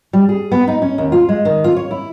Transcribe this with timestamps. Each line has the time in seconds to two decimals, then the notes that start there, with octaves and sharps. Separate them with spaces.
0.13 G3
0.29 G#4
0.52 B3
0.68 D#4
0.82 C#4
0.98 D#2
1.12 F4
1.29 G#3
1.45 D#3
1.64 F4
1.77 C#5
1.91 E4